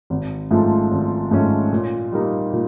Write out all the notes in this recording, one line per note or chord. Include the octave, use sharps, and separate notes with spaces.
G#1
G#2 F3 A3 C#4
G#1
G#2 F3 A3 C#4
A#2
G3 A#3 D#4
A#2